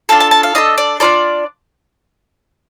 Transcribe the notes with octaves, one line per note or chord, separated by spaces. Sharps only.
D4 F4 A4 A5
A5
A5
F5
D4 F4 A4 D#5
D5
D4 F4 A4 D5